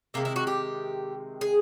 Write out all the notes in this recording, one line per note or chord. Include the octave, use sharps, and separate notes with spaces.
C3 D#3 G#3 A#3
E4
F#4
G4
G#4